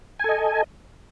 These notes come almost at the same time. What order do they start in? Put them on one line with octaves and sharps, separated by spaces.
G#5 A4 D#5